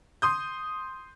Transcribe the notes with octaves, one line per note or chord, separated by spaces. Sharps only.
C6 D#6 G6